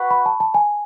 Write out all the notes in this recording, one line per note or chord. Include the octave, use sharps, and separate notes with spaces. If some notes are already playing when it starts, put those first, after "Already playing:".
Already playing: F#4 B4 F#5 C#6
B5
A5
A5
G#5